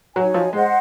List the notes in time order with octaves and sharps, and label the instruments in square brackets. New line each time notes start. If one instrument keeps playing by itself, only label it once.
[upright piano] F#3 [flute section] D#4 F#4 C#5 G#5
[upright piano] F3
[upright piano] G#3 [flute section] C5 D#5 F#5